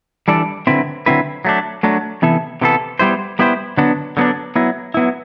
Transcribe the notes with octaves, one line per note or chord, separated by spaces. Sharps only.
E3 G3 D4 A4 D5
D3 F#3 C4 E4 B4
D3 F#3 C4 E4 B4
F#3 A3 D4
F#3 A3 D4
C3 E3 B3 E4 A4
C3 E3 B3 E4 A4
G3 B3 E4 G4 C5
G3 B3 E4 G4 C5
D3 F#3 B3 D4
D3 F#3 B3 D4
F#3 B3 E4
F#3 B3 E4